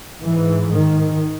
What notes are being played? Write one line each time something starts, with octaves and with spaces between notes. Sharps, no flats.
G#2 E3
D#3